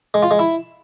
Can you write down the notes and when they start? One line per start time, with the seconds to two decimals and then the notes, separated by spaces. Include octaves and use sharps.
0.14 G#3
0.23 F4
0.31 G#3
0.39 E4